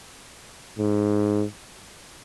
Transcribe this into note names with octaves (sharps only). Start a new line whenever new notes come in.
G#2